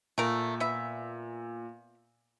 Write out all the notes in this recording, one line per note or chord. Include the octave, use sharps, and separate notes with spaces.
A#2 A3 A#4
B3 E5